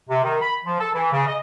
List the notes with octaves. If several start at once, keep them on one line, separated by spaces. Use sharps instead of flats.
C3
D#3
B5
F3
A4
E3
C#3
D#5